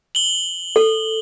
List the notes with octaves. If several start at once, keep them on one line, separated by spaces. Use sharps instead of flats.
F#7 G7
A4